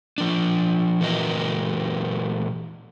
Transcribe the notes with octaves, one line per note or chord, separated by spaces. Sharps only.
F3 D4
A#2 E3 F#4 A#4 D#5